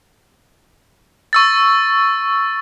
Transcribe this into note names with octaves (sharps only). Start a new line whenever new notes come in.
C#6 E6 A6